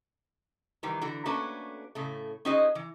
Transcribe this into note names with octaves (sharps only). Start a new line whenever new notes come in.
D#3 E3 G3
D3 E3 F#4
A3 A#3 C#4 D4 F#4 B4
A2 C#3 A3
C#4 D#4 F#4 G#4 C5 D#5
E3